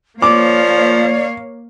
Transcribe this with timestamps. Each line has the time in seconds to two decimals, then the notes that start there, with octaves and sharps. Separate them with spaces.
0.22 F3 A#3 C#5 D5 F5 D6